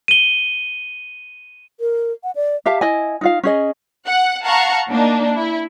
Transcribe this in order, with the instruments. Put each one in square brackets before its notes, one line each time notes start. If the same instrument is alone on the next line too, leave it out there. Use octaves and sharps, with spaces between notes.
[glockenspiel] D#7 G7
[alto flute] A#4
F#5
D5
[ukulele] G4 E5 F5 A5
E4 D#5 G#5
D#4 F4 F5
C#4 G#4 D#5
[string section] F#5
F5 F#5 A5 A#5 C#6
A#3 D4 D#4
E4